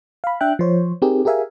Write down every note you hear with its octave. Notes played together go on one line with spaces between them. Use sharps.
F5 B5
D4 E5 G5 F#6
F3 C5 C#5
C4 D#4 G4 G#4 A#4
G4 G#4 A#4 E5 F5 G#5